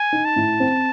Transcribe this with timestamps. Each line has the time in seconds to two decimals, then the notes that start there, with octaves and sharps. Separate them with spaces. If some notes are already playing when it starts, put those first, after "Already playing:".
Already playing: G#5
0.13 D#4
0.25 A5
0.36 A2
0.60 C4